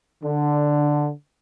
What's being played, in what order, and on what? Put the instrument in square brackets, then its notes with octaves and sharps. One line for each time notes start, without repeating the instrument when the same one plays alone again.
[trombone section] D3